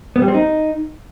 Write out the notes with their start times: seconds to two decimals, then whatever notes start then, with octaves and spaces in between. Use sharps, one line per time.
0.16 B3
0.22 G3
0.28 C4
0.34 D#4